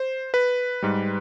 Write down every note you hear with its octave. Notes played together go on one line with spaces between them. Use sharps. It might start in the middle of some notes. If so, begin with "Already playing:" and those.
Already playing: C5
B4
G#2 G3